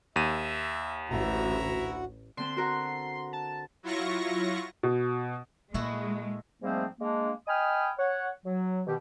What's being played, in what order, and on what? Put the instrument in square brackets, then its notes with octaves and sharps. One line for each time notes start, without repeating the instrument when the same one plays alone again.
[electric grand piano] D#2 D#7 [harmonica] E5
[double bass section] A1 [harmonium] D2 F#4 F#5 [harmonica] E4 E5 A#5
[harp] D3 C4 [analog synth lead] C6
[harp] F#4 A#4 F#5
[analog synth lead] A5
[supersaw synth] F#3 E4 F4 C#6 A#6
[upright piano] B2
[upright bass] A#2 [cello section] G#3 [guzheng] A3 E4 F#4
[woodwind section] G#2 F3 G3 A3 A#3 C4
G#3 A#3 D4
D#5 G5 G#5 B5 D#6 F6
C#5 F#5
F#3
B2 D#3 G4